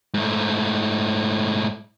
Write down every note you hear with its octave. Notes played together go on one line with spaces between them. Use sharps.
G#2 A3